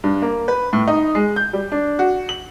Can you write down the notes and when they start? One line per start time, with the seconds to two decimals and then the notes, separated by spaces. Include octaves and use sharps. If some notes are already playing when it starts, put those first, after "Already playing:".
0.04 G2
0.22 A#3
0.48 B4
0.73 A2
0.88 D#4
1.15 G#3
1.36 G6
1.53 G3
1.72 D4
1.99 F#4
2.29 F#7